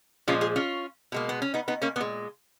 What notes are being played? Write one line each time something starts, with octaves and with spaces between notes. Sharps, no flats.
A#2 F3 G#3 C#4 F4
F4 G#4
C#4 F4
B2 G#3 A#3
B3
C#4
B3 D#4
B3 D#4
A#3 C#4
A#2 G#3 B3